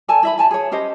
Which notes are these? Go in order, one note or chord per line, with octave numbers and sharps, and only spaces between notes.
A4 D5 G#5 A5
E4 E5 B5
E4 G#5 A5
G#4 C#5
C#4 G4 C5 D#5